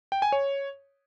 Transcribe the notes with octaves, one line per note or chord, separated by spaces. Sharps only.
G5
G#5
C#5